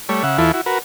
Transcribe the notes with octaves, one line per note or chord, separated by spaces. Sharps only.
G3 A3 C#5
C#3 E5 F#5
E2 E3 E4 F4 A4
E4 F#4
F#4 A#4 B4